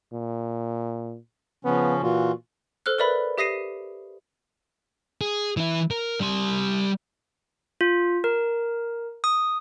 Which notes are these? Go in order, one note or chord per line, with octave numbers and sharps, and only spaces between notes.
A#2
C#3 F3 B3 C#4
A#2 E3 F4 F#4
A4 C5 F6 F#6
A#4 B4 D5 E5 B5
G4 E5 D#6 A#6 C7 D#7
G#4
E3 E4
A#4
G3 C6
F4
A#4
D#6